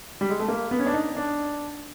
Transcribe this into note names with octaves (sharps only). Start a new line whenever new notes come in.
G3
G#3
A3
A#3
B3
C#4
D4
D#4
D4